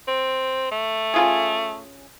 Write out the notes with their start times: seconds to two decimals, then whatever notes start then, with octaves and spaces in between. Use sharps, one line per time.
0.08 C4
0.71 A3
1.14 C#4 F4 G#4